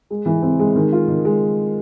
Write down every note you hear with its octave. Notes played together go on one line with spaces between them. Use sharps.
G#3
E3
C4
G#3
D#3
F4
D#3
G#3